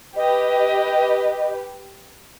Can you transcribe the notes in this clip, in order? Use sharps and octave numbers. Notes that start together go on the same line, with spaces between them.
G4 B4 D#5